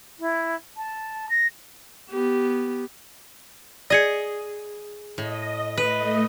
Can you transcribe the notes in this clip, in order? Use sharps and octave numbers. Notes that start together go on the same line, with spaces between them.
E4
A5
A#6
B3 G4
G#4 D5 D#5 G#6 C#7
A2 D#5
A3 B4 D#5